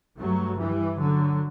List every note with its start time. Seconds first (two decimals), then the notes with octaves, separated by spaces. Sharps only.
0.18 G2 F#3 A3
0.59 E3 G3
1.00 D3 F#3